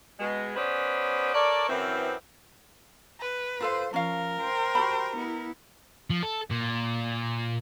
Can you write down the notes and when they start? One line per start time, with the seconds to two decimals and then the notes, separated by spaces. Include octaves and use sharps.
0.20 B2 G#3
0.56 B3 C#4 G#4 B4 C5 D5
1.34 A4 A#4 C#5 D5
1.69 F#2 E3 C4
3.21 B4
3.61 F4 A4 C5 F5
3.94 F3 C#4 A#4 F5
4.40 C5 G5
4.75 F#4 G4 B5
5.16 B3 E4
6.10 F3
6.23 A4
6.51 A#2